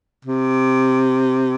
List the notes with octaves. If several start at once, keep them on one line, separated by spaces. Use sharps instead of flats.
C3